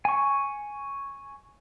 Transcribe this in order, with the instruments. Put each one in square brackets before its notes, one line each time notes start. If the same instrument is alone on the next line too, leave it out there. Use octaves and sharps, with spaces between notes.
[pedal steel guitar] G#5 C#6